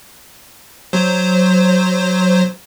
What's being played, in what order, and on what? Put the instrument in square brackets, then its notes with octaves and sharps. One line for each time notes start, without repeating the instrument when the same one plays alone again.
[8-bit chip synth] F#3 C5